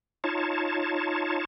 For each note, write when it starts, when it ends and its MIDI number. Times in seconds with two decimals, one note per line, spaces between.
0.24 1.45 63
0.24 1.45 65
0.24 1.45 73
0.24 1.45 81